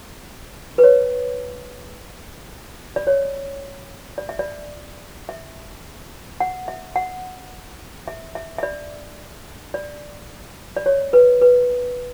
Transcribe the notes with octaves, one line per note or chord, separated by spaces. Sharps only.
B4
C#5
D5
C#5
D5
E5
D5
E5
F#5
E5
F#5
E5
E5
E5
D5
D5
D5
C#5
B4
B4